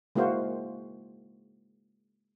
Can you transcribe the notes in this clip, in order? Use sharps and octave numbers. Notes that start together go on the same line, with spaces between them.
G#3 A#3 E4 F#4 C5 F5